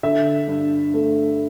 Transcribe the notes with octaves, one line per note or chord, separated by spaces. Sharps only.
D3 E5
G2
A3